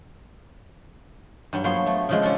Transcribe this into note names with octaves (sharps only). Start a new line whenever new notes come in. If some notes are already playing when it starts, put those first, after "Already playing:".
G2 F#3
F3 F#3 A#3 B3 C#5 C6
A3
C#3 F3 G#3
C#4 D4 F4 A4